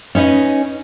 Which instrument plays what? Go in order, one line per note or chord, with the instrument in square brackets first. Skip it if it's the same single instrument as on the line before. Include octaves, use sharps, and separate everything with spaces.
[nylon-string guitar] C#4 D#4 B4 D#5